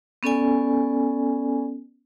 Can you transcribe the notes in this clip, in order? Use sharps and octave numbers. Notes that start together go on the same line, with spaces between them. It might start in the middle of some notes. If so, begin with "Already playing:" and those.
B3 C#4 A4 D5 G#5